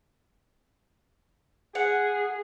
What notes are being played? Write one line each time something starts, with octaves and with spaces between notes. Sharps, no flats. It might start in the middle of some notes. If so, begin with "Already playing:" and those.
G#4 F#5